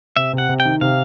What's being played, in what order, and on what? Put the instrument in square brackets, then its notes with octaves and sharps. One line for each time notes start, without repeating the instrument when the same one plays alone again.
[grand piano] C3 [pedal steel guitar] E5
[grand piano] C3
[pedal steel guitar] F#5
[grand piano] C3
[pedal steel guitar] G5
[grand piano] D#3
[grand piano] C3 [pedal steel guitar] F5